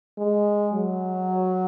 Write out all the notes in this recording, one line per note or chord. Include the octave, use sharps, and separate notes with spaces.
G#3
F#3